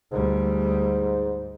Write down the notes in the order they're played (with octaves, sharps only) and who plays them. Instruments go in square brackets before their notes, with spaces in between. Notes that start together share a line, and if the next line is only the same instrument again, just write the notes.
[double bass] D2 G3 [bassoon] G#2